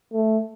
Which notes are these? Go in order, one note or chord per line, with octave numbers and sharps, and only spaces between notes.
A3